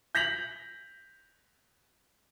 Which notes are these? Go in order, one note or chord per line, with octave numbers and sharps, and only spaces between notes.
G6 A#6 B6 F7 F#7